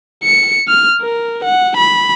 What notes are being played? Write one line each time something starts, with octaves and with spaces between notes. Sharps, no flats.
C#7
F6
A#4
F#5
B5